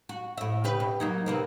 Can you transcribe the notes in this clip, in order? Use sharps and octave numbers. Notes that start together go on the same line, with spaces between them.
F#4
A2 E5
C#3 G4 B4
B2
F#3 A#3 D#4
C3 A#3 B3